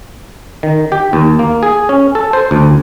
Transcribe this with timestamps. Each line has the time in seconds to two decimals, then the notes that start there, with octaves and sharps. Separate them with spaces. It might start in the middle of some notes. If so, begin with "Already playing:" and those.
0.63 D#3
0.92 G4
1.13 D#2
1.39 A#3
1.63 G#4
1.89 C#4
2.15 A4
2.33 C5
2.51 D2